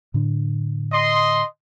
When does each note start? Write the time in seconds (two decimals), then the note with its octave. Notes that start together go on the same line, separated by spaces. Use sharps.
0.14 A2 D3 D4
0.93 D#5 C6